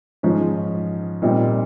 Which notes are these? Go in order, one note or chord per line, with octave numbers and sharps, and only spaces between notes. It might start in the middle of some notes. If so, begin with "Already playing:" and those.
G#2 F3 G#3 C#4
A#2 G3 C4 D#4